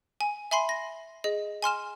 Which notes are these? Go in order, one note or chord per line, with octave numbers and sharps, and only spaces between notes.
G#5
E5 G#5 B5 C6 C7
A#6
G#4 D#5
G#5 C6 F6 E7